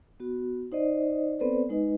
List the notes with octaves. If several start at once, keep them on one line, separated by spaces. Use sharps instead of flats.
B3 F#4
D#4 C5 D5 D#5
B3 C4 A4 B4 C5 D5
G#3 D#4 B4 D#5